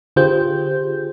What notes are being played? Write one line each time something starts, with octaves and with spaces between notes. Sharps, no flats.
D3 F4 G4 G#4 C5 G6